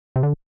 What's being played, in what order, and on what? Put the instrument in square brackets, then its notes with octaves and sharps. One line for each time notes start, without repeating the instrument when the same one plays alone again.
[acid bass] C3
D3